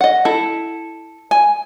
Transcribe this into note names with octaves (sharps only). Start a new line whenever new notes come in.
D#5 F#5
E4 A4
G#5